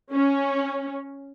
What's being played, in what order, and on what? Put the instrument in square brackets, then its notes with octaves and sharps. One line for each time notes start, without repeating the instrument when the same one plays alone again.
[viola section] C#4